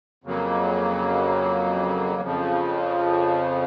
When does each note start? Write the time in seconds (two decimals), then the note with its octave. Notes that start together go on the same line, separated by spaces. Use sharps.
0.24 F2 C#3 F#3 A#3
2.22 F2 C#3 F3